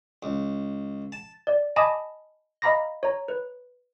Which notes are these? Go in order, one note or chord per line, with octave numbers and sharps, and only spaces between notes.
C#2
A5
D5
D#5 G#5 A5 B5 D6 D#6
D#5 F5 A#5 B5 D6 A#6
C#5 A#5
B4